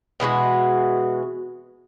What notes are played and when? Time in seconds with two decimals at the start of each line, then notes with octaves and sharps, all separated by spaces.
0.20 B2 E3 G#3 F#4